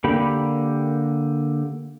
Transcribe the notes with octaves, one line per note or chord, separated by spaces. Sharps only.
D3 A#3 G4 B5